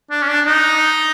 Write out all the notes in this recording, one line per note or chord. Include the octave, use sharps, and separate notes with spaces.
D4
C#4
D4
D#4